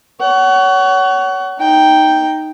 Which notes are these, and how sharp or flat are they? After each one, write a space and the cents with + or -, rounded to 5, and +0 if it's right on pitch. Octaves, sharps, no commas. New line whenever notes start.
C#5 +20 F#5 +30
D#4 +0 G5 +0